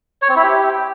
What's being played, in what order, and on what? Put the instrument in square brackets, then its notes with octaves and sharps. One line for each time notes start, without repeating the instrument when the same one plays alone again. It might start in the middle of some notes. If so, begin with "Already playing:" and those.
[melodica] C#5
C4
E4
G4